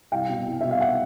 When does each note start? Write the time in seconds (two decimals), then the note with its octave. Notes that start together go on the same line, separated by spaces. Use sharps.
0.12 C2 F5 G5
0.29 B2
0.46 C2
0.61 B2 E5
0.71 F5
0.80 E5 F#5